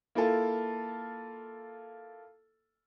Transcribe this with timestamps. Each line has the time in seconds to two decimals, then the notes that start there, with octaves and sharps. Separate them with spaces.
0.15 A#3 E4 F4 A4